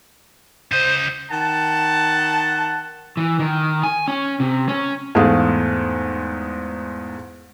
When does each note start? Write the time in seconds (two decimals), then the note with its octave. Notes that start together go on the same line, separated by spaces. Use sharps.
0.72 C#3 C5 D#5
1.31 D#3 F#5 A5
3.17 E3
3.39 D#3
3.83 G#5
4.08 C#4
4.40 C3
4.69 C#4
5.15 E2 G#2 A3 G#4 F5